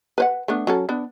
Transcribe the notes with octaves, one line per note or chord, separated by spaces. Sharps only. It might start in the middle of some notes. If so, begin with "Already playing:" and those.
B4 C5 F#5
A3 B3 D4
F#3 C#4 A4
B3 D4